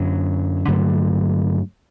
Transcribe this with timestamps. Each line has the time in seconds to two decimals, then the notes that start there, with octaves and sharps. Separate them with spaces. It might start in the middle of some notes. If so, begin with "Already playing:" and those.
Already playing: F#2 D3 F#3
0.68 G2 D3 F#3 A3